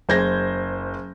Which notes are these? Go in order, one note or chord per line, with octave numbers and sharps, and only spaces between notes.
F#1 C5 G6 G#6 A#6